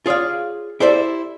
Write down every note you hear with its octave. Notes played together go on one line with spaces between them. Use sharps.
F4 G#4 C#5 D5 F5
E4 G4 A4 C5 D5 E5